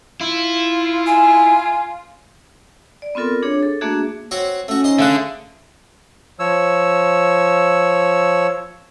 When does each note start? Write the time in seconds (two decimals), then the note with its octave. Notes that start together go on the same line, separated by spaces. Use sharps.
0.21 E4 F4
1.07 G#5
3.02 D5
3.15 B3 C4 F4 A4 A#4
3.42 D4 G#4 C#5
3.63 A4
3.81 A3 A#3 D4 F#4 G#4 E5
4.31 C4 F#4 C#5
4.68 A3 C#4 F#4
4.84 D#4 C5 C6
4.99 D3 A3 G#4 E5 F5 F#6
6.39 F3 C#5 E6